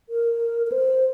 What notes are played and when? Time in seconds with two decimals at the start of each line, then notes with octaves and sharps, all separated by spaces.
0.09 A#4
0.67 A#4
0.72 C5